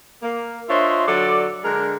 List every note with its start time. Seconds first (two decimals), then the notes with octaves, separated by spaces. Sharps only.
0.23 A#3
0.69 D4 F4 C5 C#5 D#5 E5
1.07 D3 F#3 A4 D5
1.64 D3 G#3 D4 A#4